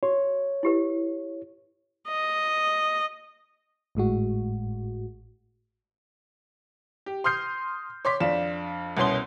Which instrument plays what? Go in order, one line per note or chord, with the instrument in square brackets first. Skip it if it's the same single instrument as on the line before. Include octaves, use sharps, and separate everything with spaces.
[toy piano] F#4 [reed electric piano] C#5
[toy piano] E4 G4 B4
[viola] D#5
[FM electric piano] G#1 A2 G#3 F#4
[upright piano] G4
C6 D#6 F6 G6 C7
C#5 C6 D6 B6
F2 D4 F4 E7
C2 B2 B3 C#4 C6 G7